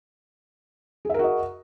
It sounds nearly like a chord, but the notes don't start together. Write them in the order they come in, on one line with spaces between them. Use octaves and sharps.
G#4 E5 A#4 F#4 D#5